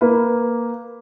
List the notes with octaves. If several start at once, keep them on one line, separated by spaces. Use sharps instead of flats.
A#3 B4